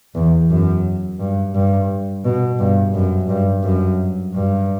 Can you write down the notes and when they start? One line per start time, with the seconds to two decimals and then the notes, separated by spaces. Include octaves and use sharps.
0.15 E2
0.50 F#2
1.19 G2
1.54 G2
2.25 B2
2.59 G2
2.94 F#2
3.28 G2
3.63 F#2
4.33 G2